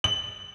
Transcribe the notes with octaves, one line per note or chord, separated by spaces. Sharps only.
F#7